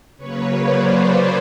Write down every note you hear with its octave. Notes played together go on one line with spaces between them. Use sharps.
C#3 F#3 A#3 B4 C#5
C5 D5